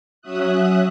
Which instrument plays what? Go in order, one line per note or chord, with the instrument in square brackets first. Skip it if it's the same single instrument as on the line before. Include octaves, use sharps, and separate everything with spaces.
[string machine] F#3 C#4 F#4 E5 D#6 F#6